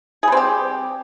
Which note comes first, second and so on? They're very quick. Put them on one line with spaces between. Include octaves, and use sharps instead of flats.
G#4 G3 C4 G4